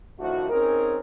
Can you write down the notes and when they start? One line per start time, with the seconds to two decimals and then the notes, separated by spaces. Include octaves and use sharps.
0.19 A2 D#3 F3 A3 D4 F#4
0.50 C4 C#4 D#4 G#4 A#4